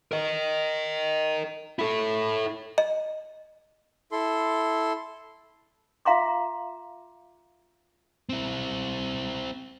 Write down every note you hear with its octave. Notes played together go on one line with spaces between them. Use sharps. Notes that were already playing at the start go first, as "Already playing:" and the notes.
A#4 D#5
E4 A4
D#5
E4 A4 C6
F4 E5 F5 A#5 C6 D6
C4 E4